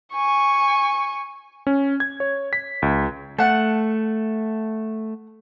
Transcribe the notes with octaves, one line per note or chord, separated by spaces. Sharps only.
G#5 C#6
C#4
G#6
C#5
B6
C#2
A3 F#5 A5